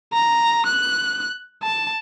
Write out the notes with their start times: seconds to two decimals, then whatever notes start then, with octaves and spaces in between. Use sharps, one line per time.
0.13 A#5
0.66 F#6
1.63 A5